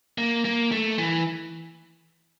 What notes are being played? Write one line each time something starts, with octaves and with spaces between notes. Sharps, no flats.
A#3
A#3
A3
E3